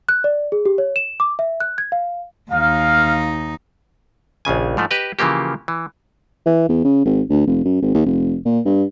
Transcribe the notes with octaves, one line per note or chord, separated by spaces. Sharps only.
F#6
D5
G#4
G4
C#5
E7
D6
E5
F#6
G#6
F5
D#2 D#4 F5
A#1 D#2 C#3 G#5
G#2 F3 A3
G4 B4 D#5
C#3 E3 F3 A#3 G4
E3
E3
E2
C#3
G#1
D2
F1
F#2
G#1
D#2
F1
A#2
G2